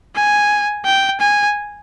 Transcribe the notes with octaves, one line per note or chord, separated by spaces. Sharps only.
G#5
G5
G#5